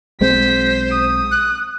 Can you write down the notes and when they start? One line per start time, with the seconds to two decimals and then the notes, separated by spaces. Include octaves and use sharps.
0.21 B1 G#3 C4 C5 B6
0.91 D#6
1.32 F#6